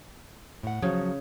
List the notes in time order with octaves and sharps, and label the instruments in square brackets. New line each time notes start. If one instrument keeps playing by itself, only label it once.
[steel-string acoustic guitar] A2 F#5
[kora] C#3 C#5 [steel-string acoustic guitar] F3 F#3 F#4